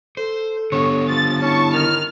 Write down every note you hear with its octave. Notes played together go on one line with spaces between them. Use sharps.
A4 C5
D3 B3 C#5
F3 A6
C#4 E4 A5 C#6
D#3 F6